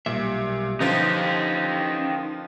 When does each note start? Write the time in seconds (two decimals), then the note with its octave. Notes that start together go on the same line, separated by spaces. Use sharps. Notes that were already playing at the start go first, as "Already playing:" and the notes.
0.06 B1 A#2 G3 E5
0.80 D3 F3 C#4 D#4 F4 G4 B4